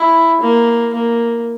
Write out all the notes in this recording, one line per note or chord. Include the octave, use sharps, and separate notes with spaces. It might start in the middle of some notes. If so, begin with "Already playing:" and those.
Already playing: E4
A#3
A#3